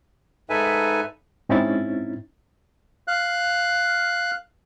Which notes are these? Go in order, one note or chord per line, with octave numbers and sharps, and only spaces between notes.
G#2 D#4 A4 B4 E5 G#5
G#2 C4 C#4 D#4 E4 A6
F5 F#6